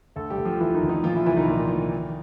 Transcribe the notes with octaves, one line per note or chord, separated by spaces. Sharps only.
D2 A3 A4
G3 G4
D2
F3 F4
D3 E3 E4
D#3 D#4
D2
D#3 D#4
A#2 F3 F4
E3 E4
C2 E3 E4
D#3 D#4
A#2
A#2
D#3